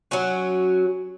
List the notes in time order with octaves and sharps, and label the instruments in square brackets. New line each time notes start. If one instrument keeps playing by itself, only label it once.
[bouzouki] F#3 C#4 F#4